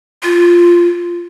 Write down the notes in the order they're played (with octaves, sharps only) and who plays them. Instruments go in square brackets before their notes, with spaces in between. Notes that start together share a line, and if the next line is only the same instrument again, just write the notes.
[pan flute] F4